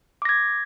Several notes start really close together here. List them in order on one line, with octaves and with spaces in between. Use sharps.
D6 A#6 G#6